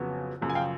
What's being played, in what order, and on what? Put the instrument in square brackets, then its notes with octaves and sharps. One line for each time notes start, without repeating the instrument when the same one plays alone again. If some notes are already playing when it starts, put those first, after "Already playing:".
Already playing: [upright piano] F2 C#3 F#3 B3
F#2 C#3 F3
G#5
F5 G5